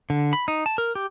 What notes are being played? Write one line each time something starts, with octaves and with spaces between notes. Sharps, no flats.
D3
B5
D#4
A5
A#4
G4